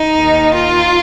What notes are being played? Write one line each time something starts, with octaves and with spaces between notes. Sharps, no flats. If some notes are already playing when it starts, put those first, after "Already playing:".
Already playing: D#4
D#2 D#3
F4